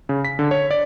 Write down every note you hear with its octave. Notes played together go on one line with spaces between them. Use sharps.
C#3
B6
D3
C#5
D5